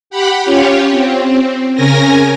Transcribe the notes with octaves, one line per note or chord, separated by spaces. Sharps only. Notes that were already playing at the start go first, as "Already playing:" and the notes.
G4 F#5 B5
C#4 F4 G4 C#5
C4
C#3 C#4 A#4 G#5 A#6